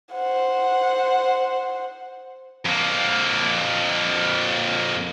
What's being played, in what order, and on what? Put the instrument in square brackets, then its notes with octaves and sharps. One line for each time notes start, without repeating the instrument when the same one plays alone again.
[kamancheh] C5 F#5
[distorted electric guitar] F2 A#3